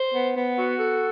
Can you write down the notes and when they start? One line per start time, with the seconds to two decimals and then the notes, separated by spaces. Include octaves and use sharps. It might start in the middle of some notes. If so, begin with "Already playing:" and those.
Already playing: C5
0.13 B3
0.35 B3
0.58 F#4
0.79 A4